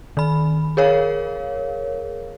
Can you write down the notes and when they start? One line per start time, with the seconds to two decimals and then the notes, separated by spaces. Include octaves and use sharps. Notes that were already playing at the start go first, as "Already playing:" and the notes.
0.17 D#3 B5
0.77 G#4 A#4 C#5 F5